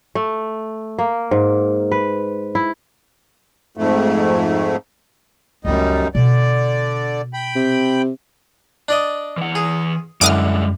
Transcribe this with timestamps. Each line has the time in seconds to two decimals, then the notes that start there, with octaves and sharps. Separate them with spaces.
0.15 A3
0.99 A#3
1.31 G#2
1.92 B4
2.55 E4
3.77 F2 G#2 A3
5.65 C#2 F#2 G3 A3 D#4
6.15 B2 D3 D5
7.34 G5 B5
7.55 C3
8.89 D4 D5 D#5
9.37 E3 F#5
9.55 G#4
10.21 F#2 D3 E3 G3 G#3 D6 D#6 F6